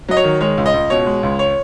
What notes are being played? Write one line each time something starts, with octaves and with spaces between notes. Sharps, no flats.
F#3 D#5
C#5
D#3
G#3 C#5
C#2
D#5
C#2
B2 C#5
G#3
C#2
C#5